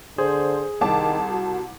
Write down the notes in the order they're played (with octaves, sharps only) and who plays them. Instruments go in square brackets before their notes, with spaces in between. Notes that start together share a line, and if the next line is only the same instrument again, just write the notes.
[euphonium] D3 [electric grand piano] G#4 [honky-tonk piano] C5
[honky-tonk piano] C2 A5 D6 [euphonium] D#3
[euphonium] F#4